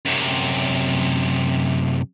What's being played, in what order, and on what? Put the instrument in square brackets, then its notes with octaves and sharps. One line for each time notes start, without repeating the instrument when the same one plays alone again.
[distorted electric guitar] F#2 C3